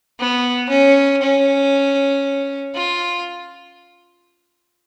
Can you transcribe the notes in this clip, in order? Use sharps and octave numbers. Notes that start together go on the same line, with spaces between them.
B3
C#4
C#4
F4